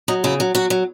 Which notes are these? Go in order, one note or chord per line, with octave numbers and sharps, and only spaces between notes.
F#3 D#4
C#3 E4
F#3
F#3 F#4
F#3